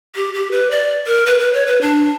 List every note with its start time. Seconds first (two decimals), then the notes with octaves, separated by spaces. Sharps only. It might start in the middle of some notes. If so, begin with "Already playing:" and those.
0.16 G4
0.34 G4
0.51 B4
0.71 D5
1.07 A#4
1.26 B4
1.40 B4
1.53 C#5
1.67 B4
1.81 D4